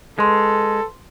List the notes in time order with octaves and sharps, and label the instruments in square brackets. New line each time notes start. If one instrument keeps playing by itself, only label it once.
[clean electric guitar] G#3 [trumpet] A4 [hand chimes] B4 C6